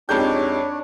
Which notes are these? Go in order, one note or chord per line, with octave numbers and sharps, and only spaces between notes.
F2 G#3 D4 D#4 G4 C#5 G6